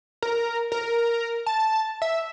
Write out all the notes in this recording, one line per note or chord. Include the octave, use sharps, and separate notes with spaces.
A#4
A#4
A5
E5